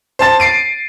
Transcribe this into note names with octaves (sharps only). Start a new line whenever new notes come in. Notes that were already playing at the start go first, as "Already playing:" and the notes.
C5 A5 A6
C7 D7 D#7